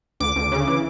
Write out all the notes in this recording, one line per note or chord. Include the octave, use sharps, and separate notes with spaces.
D2 D6
D2
C#3
E3